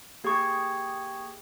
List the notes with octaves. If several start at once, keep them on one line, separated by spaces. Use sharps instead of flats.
A#3 G4 G#4 G5 C#6 G#6